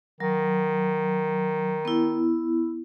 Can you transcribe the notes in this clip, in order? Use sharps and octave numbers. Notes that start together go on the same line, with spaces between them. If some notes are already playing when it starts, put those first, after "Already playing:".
D#3 F#3
B3 E4